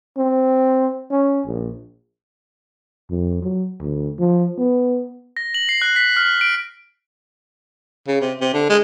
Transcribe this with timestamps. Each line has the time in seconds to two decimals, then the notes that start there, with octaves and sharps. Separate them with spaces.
0.18 C4
1.11 C#4
1.46 A#1
3.11 F2
3.43 F#3
3.81 D2
4.19 F3
4.58 B3
5.37 A#6
5.54 F#7
5.69 C7
5.82 F#6
5.96 B6
6.16 F6
6.41 D7
8.08 C#3
8.21 C3
8.41 C3
8.54 D3
8.69 G#3